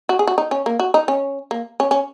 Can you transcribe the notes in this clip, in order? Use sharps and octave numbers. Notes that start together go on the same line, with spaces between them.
F#4
G#4
F#4
D#4
C#4
A#3
F#4
D#4
C#4
A#3
C#4
C#4